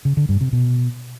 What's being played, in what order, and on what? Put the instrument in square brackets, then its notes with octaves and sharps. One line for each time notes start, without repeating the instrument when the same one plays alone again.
[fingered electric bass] C#3
D3
G2
C3
B2